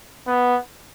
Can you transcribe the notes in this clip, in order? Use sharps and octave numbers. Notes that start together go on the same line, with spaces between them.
B3